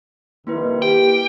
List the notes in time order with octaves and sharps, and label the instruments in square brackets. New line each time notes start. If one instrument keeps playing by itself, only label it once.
[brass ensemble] C2 F2 D#3 [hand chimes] A#3 E4 B4
[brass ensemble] G4 [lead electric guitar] G5